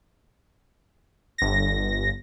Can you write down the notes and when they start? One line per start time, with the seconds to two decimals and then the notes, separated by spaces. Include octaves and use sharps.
1.38 G1 A#6